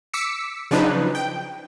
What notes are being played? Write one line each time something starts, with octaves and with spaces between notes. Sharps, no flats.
D6 E6 B6 C#7
C#3 F3 F#3 D4 D#4 B4
G5